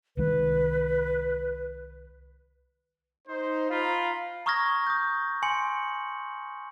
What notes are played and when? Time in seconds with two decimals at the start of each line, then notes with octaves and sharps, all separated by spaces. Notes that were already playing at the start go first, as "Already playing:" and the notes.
0.17 C2 D#3 G#3 B4
3.28 D#4 C5
3.70 F4 F5 A#5 B5
4.46 A#5 C#6 D#6 F6 G#6 A#6
4.87 D#6 G6
5.43 G#5 C6 C#7 F#7